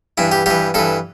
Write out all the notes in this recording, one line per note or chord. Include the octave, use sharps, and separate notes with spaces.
G2 E3 E4
G4
G2 E3 G4
G2 E3 A4